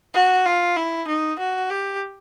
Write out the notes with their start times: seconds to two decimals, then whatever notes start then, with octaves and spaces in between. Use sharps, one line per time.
0.14 F#4
0.45 F4
0.76 E4
1.07 D#4
1.39 F#4
1.70 G4